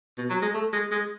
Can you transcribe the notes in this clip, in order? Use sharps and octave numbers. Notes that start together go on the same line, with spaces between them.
B2
F#3
G#3
A3
G#3
G#3